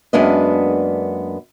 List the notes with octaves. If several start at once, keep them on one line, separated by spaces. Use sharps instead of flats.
F#2 G#3 A#3 B3 D4 D#5